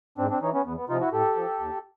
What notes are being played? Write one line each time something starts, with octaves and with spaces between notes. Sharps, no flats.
G#2 C4 D4
C4 D4
E3 C#4 D#4
B3 C#4
E2 B3
B3
C3 F3 D#4 F4
E4 F#4
A2 G4 A4
F3
D#2